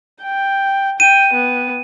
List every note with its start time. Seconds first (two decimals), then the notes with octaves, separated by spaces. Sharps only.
0.23 G5
1.00 G5 D#7
1.34 B3